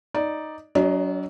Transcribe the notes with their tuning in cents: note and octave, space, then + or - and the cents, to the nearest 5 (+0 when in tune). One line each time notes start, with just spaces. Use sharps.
D#4 +0 D5 +0
F#3 +15 D4 -45 D#5 +0